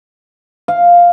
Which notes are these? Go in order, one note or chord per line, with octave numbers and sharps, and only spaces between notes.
F5